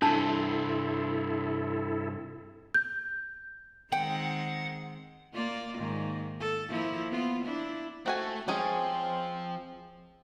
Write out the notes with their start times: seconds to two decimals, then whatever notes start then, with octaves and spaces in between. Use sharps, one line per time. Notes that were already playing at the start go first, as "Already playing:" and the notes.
0.02 G2 C3 D4 E4 A4 A5
2.74 G6
3.92 D#3 G#3 C4 F#5 G5
5.33 A#3 F4 D5
5.78 G#2 D#3 A#3
6.40 A4
6.69 F3 A#3 E4
7.11 B3 F4
7.45 D4 E4
8.06 A3 C4 F#4 G#5
8.48 F3 G#3 C4 C#4 G#4